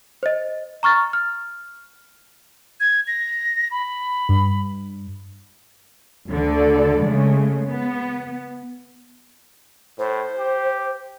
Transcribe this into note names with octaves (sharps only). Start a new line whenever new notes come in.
C5 D#5
A#5 C#6 F6 A6
F6
G#6
A#6
B5
G2
D2 D3 A4 D5
C#3 G#3 A3
B3
A2 C5
G4